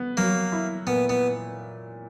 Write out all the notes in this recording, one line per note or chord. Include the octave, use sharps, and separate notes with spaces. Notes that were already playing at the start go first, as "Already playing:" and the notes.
Already playing: B3
F#3 A#3
E4
A#2 B3
B3